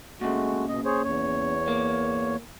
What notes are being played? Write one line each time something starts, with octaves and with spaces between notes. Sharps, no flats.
A#2 C#3 G#3 A3 F#4
B2 D#5
G#4 C5 C#5
E2 C#5
A#3